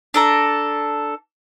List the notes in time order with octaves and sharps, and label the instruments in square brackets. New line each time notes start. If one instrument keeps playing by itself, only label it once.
[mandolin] D4 A4 A#5